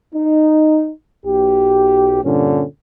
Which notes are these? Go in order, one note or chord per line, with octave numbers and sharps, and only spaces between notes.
D#4
B1 G4
G2 A#2 D3 C#4